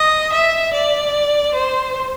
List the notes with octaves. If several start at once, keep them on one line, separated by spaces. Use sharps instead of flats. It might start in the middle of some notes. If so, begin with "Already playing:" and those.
Already playing: D#5
E5
D5
C5